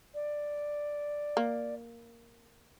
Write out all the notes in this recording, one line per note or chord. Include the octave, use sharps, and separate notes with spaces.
D5
A#3